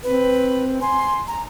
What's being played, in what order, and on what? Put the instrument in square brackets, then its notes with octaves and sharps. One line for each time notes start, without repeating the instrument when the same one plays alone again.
[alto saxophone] C4 [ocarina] B4
[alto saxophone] G#5 [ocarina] C6
[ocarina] A#5